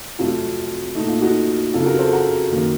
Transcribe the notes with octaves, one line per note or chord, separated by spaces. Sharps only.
F2 C3 F#3 A3 F4
A#2 A3 D#4
F4
D#4 F#4
F2 C#3 F#3 F4 A4
F#4 A#4
A4 C5
F#5 A#5
F#2 D#3 A#3